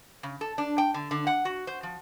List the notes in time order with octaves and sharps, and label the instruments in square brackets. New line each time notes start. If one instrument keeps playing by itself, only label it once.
[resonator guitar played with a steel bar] C#3
A4
D4
G5
D3
D3
F#5
F#4
C5
F3